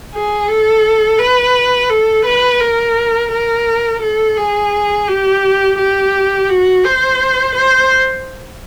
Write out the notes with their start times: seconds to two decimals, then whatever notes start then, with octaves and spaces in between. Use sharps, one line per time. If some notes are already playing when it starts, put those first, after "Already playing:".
0.13 G#4
0.48 A4
1.19 B4
1.89 A4
2.25 B4
2.60 A#4
3.31 A#4
4.01 A4
4.37 G#4
5.08 G4
5.78 G4
6.49 F#4
6.84 C5
7.55 C5